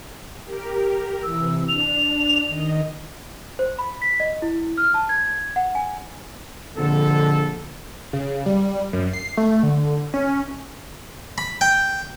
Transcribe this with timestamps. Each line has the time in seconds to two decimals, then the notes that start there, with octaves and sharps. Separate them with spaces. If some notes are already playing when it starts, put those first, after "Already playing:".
0.44 G4 A#4
1.24 C3 E3 E6
1.69 D4 F7
2.48 D#3 D#5
3.59 C5
3.79 B5
4.02 B6
4.20 D#5
4.42 E4
4.78 F6
4.94 A5
5.09 G#6
5.56 F#5
5.75 G#5
6.76 A#1 F2 D3 A4
8.13 C#3
8.46 G3
8.93 F#2
9.13 C7
9.38 A3
9.63 D3
10.14 C#4
11.38 B5
11.61 G5